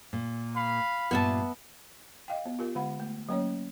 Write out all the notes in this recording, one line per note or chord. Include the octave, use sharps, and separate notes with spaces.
A#2
F5 B5
G2 A#2 B3 F4 E5 A5
D#5 F5 G5
B3
F4 G4 A#4
D3 G#3 F#5 B5
A3
F#3 A#3 C#4 C#5